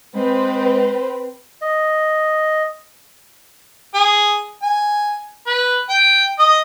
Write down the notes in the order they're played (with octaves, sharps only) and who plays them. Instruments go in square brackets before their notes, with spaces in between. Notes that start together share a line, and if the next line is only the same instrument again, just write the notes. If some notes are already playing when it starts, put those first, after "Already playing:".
[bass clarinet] G#3 [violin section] C4 B4 C5
[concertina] D#5
[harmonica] G#4
G#5
B4
G5
D#5